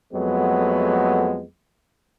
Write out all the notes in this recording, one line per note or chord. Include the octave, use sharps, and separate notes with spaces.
F2 F#3 G#3 A3 B3